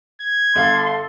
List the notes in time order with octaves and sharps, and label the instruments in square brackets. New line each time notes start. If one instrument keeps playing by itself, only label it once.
[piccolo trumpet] G#6
[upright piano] G1 F5 [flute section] A4 [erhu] C6